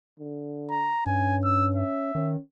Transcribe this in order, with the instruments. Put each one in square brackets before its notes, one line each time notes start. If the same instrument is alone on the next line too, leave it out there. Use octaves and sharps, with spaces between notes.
[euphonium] D3
[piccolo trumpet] A#5
[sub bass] G2 [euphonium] C#4 [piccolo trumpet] G#5
[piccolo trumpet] E6
E5
[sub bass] D#3 [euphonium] C#4